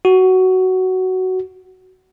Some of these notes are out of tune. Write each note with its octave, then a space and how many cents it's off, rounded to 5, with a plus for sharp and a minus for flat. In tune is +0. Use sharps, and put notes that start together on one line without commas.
F#4 +10